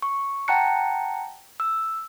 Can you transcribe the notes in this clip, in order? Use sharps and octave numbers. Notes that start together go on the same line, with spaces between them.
C#6
F#5 G5 A5 A#5 F#6 C#7
E6